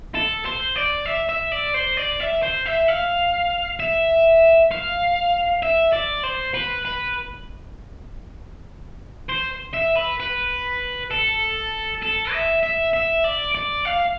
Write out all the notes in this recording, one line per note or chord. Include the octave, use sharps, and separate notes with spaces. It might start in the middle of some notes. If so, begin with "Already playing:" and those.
A4
C5
D5
E5
E5
D5
C5
D5
E5
C5
E5
F5
E5
F5
E5
D5
C5
B4
B4
C5
E5
B4
B4
A4
A4
E5
E5
E5
D5
D5
F5